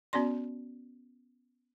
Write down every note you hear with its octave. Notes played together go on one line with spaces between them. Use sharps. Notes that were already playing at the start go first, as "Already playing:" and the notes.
B3 C#4 F#4 D5 C6